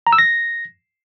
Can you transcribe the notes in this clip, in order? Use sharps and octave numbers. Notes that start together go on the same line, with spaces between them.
A#5
E6
A#6